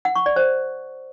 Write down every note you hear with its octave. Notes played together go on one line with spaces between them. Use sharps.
F#5
C#6
D5
C5